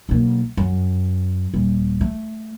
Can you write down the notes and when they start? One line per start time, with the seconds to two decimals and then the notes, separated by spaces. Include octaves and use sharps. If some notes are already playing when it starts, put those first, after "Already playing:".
0.09 B1 A#3
0.57 F#2
1.54 D#1
2.01 A3